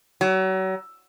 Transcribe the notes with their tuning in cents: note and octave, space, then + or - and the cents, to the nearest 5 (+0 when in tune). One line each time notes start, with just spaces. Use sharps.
F#3 +35